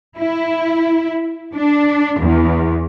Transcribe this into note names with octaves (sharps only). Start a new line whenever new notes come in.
E4
D4
E2